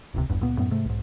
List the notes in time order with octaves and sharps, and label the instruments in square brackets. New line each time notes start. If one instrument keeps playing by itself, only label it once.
[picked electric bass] D#1 C#2 C3
G1 E2 G2
C#2 A#2 B3
F#2 A2 B3
G#2 C3 A3
B1 G#2